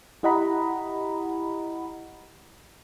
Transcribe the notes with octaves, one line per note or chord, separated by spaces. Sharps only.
E4 G4 D#5 F#5 A#5 B5